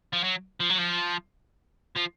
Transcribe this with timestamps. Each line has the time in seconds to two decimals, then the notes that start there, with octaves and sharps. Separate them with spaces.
0.13 F3
0.24 F#3
0.60 F3
0.70 F#3
0.78 F3
1.97 F3